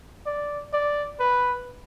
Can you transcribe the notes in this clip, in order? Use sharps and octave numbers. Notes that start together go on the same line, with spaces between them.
D5
D5
B4